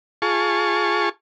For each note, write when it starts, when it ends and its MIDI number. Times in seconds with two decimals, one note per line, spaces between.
0.22 1.09 65
0.22 1.09 68
0.22 1.09 81
0.22 1.09 85